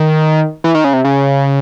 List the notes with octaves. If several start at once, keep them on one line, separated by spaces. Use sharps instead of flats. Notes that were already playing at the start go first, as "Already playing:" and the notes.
Already playing: D#3
E3
D#3
C#3
C3
C#3